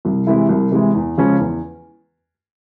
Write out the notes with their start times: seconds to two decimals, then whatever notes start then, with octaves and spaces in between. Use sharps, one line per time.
0.05 C2
0.27 C3 E3 G#3 E4
0.49 C2
0.72 C3 E3 G#3 E4
0.95 E2
1.17 C#3 F3 G#3 C#4
1.39 E2